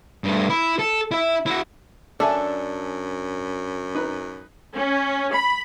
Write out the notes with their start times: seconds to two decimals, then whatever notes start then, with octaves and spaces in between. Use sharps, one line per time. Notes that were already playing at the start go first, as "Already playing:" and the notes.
0.24 G2 A3
0.50 E4
0.79 A4
1.12 E4 E5
1.46 E4 F#4
2.20 F#2 D4 A4 E5 G#5
3.95 D#4 B4
4.76 C#4
5.33 B5